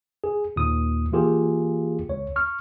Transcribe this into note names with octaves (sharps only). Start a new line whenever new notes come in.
G#4
D#2 A#2 D#6
E3 A#3 F4 G4 G#4
C#2 C#5
C#6 F6